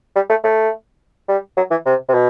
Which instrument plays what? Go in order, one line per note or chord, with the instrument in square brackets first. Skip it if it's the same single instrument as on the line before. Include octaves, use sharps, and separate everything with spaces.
[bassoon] G3
A3
A3
G3
F#3
E3
C3
C3
B2